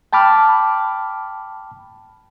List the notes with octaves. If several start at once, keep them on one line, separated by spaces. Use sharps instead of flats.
G5 A5 B5 D6 F6